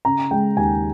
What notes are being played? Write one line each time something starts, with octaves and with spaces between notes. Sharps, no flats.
C#3 A#5
G#3 G5
D#2 G#5